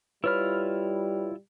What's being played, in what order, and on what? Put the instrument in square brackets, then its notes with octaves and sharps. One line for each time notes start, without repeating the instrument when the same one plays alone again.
[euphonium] G3 [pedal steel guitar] E4 F4 F6 [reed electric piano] B4 C#5 B5